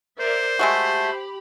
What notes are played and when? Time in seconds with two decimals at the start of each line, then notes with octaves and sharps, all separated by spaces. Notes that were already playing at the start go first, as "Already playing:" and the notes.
0.20 A#4 C5 D5 E5
0.59 G#3 A3 F#4 G4 B5